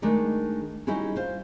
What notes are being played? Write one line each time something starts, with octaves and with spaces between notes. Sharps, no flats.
D#3 G#3 A3 D4 A#4 D5
G3 C#4 D#4 E4 F#4 G#4
F4 C5 F5